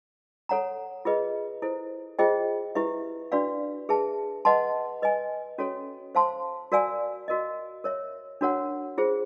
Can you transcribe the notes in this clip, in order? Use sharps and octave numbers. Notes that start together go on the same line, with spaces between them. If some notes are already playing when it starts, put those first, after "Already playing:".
A4 C#5 F#5 A#5
F4 G#4 B4 D#5
E4 A4 C5
F4 G#4 C5 D#5 G5
E4 G4 B4 E5
D4 F#4 B4 D5 F5
G#4 B4 E5 A5
B4 D#5 F#5 A5 C6
B4 D#5 G#5
C#4 F#4 A4 C#5
C5 F5 A5 C6
F#4 A#4 D5 F5 G#5
F#4 A#4 D#5
A#4 C#5 E5
D4 F#4 A#4 C#5 F#5
F4 G#4 C5